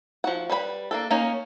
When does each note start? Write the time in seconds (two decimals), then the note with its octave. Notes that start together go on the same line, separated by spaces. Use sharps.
0.24 F3 F#4 F#5
0.50 G3 B4 C5 B5
0.91 A#3 D4 A4
1.11 A#3 C#4 D#4